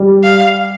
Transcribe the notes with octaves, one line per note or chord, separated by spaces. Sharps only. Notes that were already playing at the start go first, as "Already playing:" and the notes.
Already playing: G3
F5